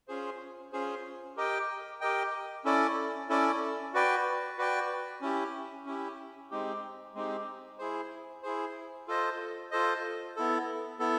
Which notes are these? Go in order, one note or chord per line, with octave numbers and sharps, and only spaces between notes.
C#4 F4 G#4 C5
C#4 F4 G#4 C5
G4 A#4 D#5 G5
G4 A#4 D#5 G5
C#4 E4 A4 D5
C#4 E4 A4 D5
F#4 B4 D5 G5
F#4 B4 D5 G5
C#4 E4 G4
C#4 E4 G4
G#3 C4 D#4 G4
G#3 C4 D#4 G4
E4 G#4 C5
E4 G#4 C5
F4 A4 C5 D#5
F4 A4 C5 D#5
B3 E4 A4
B3 E4 A4